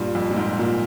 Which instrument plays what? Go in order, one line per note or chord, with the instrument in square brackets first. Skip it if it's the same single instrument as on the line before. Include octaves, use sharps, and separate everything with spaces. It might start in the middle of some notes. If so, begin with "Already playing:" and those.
Already playing: [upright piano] G2 A#2
F2
A#2
G#2
A#2